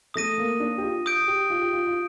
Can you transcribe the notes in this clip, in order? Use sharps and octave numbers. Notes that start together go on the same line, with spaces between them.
A3 D#6 A#6 D#7
A#3
D4
G4
F4
D#6 G6 D7
G4
F4
G4
F4
F4